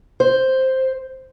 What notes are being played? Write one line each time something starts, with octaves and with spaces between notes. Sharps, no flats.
C5